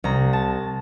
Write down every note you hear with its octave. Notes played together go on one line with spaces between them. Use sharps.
C2 A#5
A5